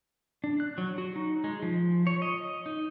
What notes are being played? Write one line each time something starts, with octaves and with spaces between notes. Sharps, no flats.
D4
F#6
F#3
F#4
D#4
G#3
F3
C#5
D#5
D#4